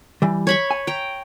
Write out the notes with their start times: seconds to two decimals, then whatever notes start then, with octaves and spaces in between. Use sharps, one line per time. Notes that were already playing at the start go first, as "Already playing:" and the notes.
0.22 E3 G3
0.47 C#5 B5 C#6
0.71 G#5
0.87 G5 A#5